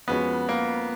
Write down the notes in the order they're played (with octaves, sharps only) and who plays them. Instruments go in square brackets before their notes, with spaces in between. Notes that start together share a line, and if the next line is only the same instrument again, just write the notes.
[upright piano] F2 F3 G#3 C#4 F#4 [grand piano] B3
[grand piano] A#3